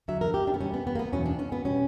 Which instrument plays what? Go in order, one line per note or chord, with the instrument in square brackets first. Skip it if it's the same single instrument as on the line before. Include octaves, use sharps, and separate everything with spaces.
[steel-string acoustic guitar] E2 D3 F#3 E5
A#4
G4
D4
B3
E2 B2 G3 C#4
B3
B3
A#3
B3
E2 B2 F#3 C#4
D4
C#4
B3
B2 G3 C#4